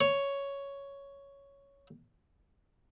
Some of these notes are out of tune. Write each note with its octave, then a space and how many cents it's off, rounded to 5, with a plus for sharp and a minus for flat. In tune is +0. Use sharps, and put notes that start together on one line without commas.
C#5 +5